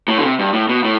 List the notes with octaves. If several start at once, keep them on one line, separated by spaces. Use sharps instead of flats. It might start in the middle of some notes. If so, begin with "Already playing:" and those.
A2
D3
C3
G2
A2
B2
A2